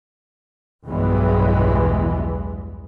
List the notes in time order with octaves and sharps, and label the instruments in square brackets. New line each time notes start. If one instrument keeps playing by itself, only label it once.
[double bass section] B1 E2 G2 E3 G#3 B3